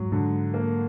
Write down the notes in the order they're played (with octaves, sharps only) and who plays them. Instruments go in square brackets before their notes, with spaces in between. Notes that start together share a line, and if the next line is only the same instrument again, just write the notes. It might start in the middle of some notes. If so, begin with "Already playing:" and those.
Already playing: [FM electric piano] G#2 [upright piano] F#3
[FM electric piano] G#2 [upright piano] D3
[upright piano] A#3